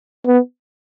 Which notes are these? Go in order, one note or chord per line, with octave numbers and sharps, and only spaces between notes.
B3